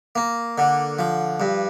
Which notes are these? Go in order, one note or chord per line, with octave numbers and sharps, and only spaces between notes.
A#3
D3
F3
G2